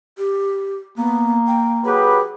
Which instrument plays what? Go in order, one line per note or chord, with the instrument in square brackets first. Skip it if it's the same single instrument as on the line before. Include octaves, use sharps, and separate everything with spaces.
[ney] G4
[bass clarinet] A#3 [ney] B3
[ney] G5
[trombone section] F#3 G4 B4 [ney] G#4